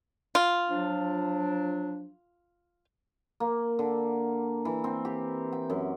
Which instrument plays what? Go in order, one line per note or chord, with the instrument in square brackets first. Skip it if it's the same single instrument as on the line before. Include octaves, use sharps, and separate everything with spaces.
[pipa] F4
[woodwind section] F3 F#3 D4
[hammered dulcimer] A#3
D3
E3
C4
G4
G5
F#2